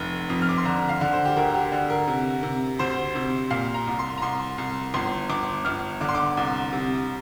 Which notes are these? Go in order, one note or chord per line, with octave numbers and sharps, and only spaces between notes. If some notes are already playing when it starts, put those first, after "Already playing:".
Already playing: F1
F2
F6
D6
C6
D3 A#5
F5
D3
C5
G4
D2 A#4
G4
D3
A#4
C3
C3
D2 C5
C3
A#2 F5
A#5
C2
C6
A#5
C2 C6
C2
G1 C6
G1 D6
G1 F6
D3 D6
C6
D6
C2
C3